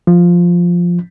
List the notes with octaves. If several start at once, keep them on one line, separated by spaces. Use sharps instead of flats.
F3